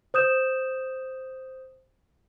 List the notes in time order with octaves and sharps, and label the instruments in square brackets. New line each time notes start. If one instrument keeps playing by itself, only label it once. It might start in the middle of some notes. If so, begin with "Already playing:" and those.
[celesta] C5 D#6 G6 E7